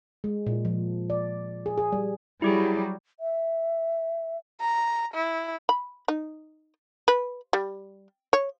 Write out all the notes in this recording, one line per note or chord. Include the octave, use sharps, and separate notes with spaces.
G#3
A#2
F3
D5
G#4
G#4
G3
F#3 G3 E4 G4 G#4
E5
A#5
E4
B5
D#4
B4
G3
C#5